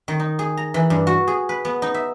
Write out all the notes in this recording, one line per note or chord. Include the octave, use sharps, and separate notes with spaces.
D#3
D#4
G#4
A#5
E3
G2
F#4
G#4
B4
B3
D#4
E5